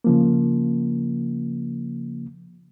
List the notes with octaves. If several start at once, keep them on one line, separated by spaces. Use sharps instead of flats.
C#3 F3 A#3